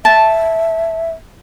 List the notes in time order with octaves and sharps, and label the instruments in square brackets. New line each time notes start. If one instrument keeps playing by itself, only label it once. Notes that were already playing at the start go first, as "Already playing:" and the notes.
[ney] E5 [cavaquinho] A5